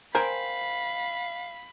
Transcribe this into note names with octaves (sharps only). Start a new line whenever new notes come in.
A#4 C5 F5 G5 G#5 B5